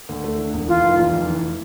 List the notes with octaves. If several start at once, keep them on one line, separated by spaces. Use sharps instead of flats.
D2
A3
D3
E1
E3 F4
F1
E2
F1
E3